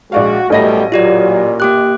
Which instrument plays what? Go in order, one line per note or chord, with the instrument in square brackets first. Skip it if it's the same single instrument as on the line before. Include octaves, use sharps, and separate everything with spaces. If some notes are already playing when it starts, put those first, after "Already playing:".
[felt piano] A#1 D5 F5 [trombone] G#3 [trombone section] F#4
[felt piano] A1 D#5 A#6 [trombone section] F#2 B2 G3 [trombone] A3
[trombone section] A#2 [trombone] F#3 [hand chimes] F4 G4 D5
[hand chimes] A#3 D6 F#6 [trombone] G4